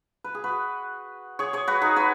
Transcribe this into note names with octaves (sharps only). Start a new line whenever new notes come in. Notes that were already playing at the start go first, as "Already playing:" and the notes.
B4
G#4
F#4 B4
G#4 C#5
G#4 C#5
F#4 B4
D#4 G#4
F#4 B4